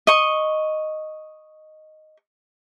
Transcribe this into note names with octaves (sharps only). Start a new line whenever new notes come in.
D#5 C#6